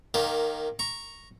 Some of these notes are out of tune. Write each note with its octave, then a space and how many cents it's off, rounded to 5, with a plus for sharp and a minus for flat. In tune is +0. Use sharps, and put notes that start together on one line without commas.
D#3 -15 A#3 +0 G4 +15
A#5 +0 C#6 -10